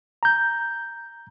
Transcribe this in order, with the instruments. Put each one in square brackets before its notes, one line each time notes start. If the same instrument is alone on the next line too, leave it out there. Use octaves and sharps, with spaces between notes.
[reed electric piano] A#5 G6